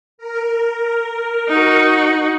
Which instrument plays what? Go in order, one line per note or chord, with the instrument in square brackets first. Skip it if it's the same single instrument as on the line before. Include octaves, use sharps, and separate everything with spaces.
[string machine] A#4
[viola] D#4 F#4